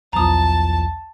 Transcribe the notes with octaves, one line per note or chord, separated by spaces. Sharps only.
B1 E2 F3 A5 A#5 D#6